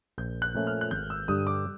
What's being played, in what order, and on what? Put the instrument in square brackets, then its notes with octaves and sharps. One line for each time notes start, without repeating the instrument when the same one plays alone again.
[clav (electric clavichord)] A#1 [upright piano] G6
[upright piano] F#6
[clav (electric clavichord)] A#2 F3 A3 C#4
[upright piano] F6
F#6
[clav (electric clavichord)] G#1 [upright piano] G6
[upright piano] E6
[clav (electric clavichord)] G2 D3 G3 [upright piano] D#6
[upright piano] D6